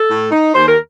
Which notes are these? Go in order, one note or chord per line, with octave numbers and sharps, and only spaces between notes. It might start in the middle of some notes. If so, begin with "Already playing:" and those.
Already playing: A4
A2
D#4
D#2 C5
A#4